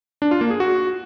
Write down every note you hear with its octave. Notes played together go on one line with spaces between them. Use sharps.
D4
F4
A#3
G#4
F#4